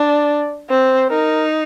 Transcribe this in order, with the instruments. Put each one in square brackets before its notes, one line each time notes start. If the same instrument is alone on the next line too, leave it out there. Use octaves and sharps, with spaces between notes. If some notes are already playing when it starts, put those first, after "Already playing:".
Already playing: [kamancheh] D4 [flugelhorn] D5
[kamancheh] C4 [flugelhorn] C5
[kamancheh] D#4 [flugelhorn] A#4